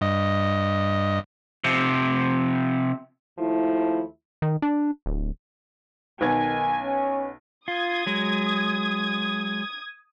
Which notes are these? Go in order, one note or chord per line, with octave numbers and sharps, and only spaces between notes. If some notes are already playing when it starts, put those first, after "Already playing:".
G2 D#5
C3 F3
D#2 F3 A3 E4
D#3
D4
D1
B1 D#3 B3 G#5 G#6
C#4
F4 D#6 G#6
F#3 G#3